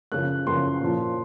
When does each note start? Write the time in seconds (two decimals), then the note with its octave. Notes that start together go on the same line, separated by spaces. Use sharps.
0.12 F#2 C#3 F3 F#6
0.47 F#2 C#3 F3 C6
0.81 A#2 F3